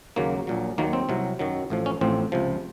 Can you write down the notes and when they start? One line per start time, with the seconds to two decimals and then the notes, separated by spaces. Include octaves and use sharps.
0.16 D#2 C#3 F#3 A#3
0.47 A#1 A#2 F#3
0.78 D#2 D#3 F#3 A#3
0.93 C4
1.09 C2 C3 F#3
1.39 F#2 D#3 F#3
1.70 A1 A2 F3
1.86 C#4
2.01 A1 A2 F3 C4
2.32 C#2 C3 F3